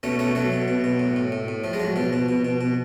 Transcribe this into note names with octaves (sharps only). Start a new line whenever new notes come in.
B2 A3 C#4
B2 A3 C#4
B2 F#3 A3
B2
B2
B2
A2
A2
A2
A2
A2 F3
G#3
F3 F#3
B2 F3
B2
B2
B2
B2